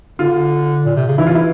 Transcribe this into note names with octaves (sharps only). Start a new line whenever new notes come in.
D3 F4
A#2
C3
C#3
E3 E4
F4
E3
E4